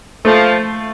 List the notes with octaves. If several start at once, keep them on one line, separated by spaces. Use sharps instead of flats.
F3 A3